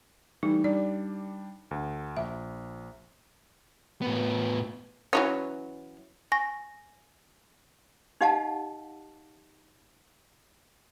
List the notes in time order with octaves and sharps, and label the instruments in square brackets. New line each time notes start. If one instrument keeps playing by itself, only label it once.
[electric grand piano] E3 G3 A3 [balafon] D#4
[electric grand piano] G3 D4 [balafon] D5
[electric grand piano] D2
[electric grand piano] A#1 [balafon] E5
[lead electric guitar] A2 B3
[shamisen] E3 F#3 C#4
[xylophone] G#5 C#6 A#6
[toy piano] D#4 G4 D#5 F5 F#5 A5